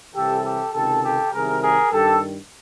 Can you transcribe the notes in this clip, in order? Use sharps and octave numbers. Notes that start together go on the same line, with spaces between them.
C2 C3 E3 G4 A4
G4 A4
C#2 C3 D#3 G4 A4
G4 A4
C2 C3 D#3 G#4 A#4
G#4 A#4
G2 D#3 G4 A4